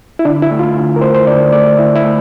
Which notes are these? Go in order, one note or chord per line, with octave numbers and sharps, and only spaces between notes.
E4
D3 D4
E4
A3
F4
D3
A#4
A3 C5
C5
D3 D5
A3 D5
D3 E4
E4
A3